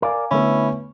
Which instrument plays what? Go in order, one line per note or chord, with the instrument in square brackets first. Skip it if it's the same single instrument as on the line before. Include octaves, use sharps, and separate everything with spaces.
[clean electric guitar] A#4 D5 [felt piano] F5 G#5 D6
[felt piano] D3 A3 B3 [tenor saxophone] C#4 [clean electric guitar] E4